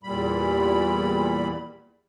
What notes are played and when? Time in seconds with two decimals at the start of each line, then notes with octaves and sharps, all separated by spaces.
0.03 E2 A#2 G3 B5